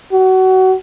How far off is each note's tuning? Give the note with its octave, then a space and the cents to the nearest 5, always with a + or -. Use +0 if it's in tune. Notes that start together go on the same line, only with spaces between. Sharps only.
F#4 +25